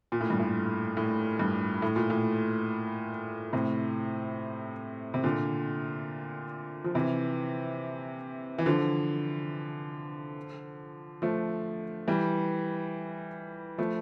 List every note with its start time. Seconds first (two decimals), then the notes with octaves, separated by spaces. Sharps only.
0.12 A#2
0.21 A2
0.30 G2
0.40 A2
0.97 A2
1.39 G2
1.82 A2
1.96 A#2
2.10 A2
3.53 A2 C3
5.14 C3
5.24 A#2 D3
6.84 F3
6.95 C3 E3
8.59 E3
8.66 D3 F3
11.22 F3 A3
12.08 E3 G3
13.78 F3 A3